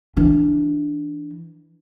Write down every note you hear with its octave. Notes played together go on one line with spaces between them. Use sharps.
E3 D4